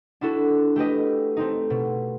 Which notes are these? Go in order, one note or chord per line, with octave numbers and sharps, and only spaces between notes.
D4 E4 F#4 A4
A3 G4 B4 D#5
A3 C4 D#4
B2